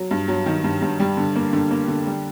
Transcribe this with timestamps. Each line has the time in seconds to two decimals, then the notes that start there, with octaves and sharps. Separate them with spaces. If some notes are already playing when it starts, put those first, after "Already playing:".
Already playing: F#3
0.11 G2
0.28 F#3
0.46 D#3
0.64 G2
0.82 G2
1.00 G3
1.17 D3
1.36 A#3
1.53 D3
1.71 A#3
1.88 D3
2.07 G3